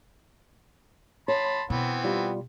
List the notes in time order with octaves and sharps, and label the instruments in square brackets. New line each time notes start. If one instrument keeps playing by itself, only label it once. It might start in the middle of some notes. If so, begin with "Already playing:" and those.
[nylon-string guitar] C#5 [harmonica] A5 B5 C6
[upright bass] B2 [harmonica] E3 B3 C4
[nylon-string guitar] G3 F4